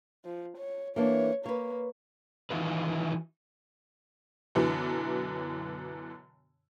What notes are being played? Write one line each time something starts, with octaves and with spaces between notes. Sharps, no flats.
F3
C#5
E3 A#3 D4 C#5
A#3 B4 C#5
D#3 E3 D#4 F4 F#4 B4
F#2 B2 D3 E3 F#3